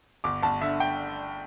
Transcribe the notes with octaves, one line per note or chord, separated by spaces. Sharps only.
G1 D6
G1 A5
D3 E5
G5